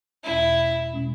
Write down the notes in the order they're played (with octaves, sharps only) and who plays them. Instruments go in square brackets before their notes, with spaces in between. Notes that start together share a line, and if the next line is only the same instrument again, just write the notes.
[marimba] E2 B2 G#3 C#4 [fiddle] E4
[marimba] B2 G#3 C#4